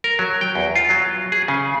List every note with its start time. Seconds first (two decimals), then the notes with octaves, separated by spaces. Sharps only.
0.04 A#4
0.19 F#3
0.41 G5
0.55 E2
0.76 F4
0.90 F#3
1.32 G#4
1.48 C#3